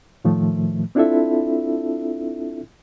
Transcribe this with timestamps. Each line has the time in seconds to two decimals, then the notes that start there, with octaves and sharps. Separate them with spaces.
0.25 A2 D#3 F3 A3
0.95 C4 D4 E4 F4 A4 E5